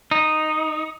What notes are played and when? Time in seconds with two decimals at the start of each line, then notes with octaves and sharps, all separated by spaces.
0.11 D#4